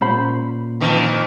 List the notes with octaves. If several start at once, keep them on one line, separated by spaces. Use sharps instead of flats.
A#2 C#4 C5 B5
F2 D#3 E3